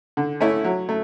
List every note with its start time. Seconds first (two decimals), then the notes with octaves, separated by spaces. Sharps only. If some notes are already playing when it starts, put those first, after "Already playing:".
0.17 D3
0.40 A3 C#4 E4
0.64 F#3
0.89 A3